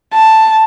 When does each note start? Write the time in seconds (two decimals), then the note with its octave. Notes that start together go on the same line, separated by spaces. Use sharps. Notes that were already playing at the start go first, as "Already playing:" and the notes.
0.13 A5